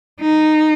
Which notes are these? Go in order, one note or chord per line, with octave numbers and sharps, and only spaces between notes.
D#4